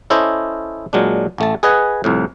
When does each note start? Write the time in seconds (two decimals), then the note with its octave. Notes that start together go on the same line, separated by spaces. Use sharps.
0.10 C#4 E4 A4 C5 D#5
0.93 A#2 F#3 G#3 D4
1.38 A1 A3 A5
1.63 G#4 B4 D#5 F#5 G#5
2.04 C2 F2 A2